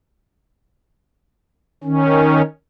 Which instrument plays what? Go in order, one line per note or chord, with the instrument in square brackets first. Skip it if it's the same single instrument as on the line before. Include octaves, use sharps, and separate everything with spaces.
[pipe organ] D#3 C#4